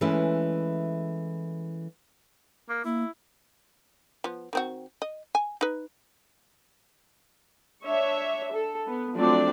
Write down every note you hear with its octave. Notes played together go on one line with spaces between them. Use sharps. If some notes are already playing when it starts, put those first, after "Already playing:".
E3 G#3 A3 C#4 E4
A#3
A#3 E4
F3 B3
D#3 C4 F#4
D#5
G#5
D#4 B4
D4 C#5 E5
A4
B3
F3 F#3 A3 C4 D4 D5